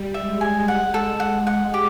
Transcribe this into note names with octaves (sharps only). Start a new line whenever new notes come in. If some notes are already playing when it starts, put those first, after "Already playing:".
Already playing: G3
G#3 E5
G#5
G#3 F#5
A4
F#5
F#5
G4